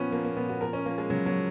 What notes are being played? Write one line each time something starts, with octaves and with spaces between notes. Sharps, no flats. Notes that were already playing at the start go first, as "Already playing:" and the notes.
Already playing: A#2 F3 B3 C#4
F3 A#3
A#3
A#2 B3
F#4
F3 A#4
C#4
F3 A#3
G#3
C#3 F#3
F#3
F3